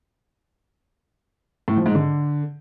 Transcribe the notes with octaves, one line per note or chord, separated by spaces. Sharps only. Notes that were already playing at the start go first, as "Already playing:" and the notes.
A2
F3
G#2
D3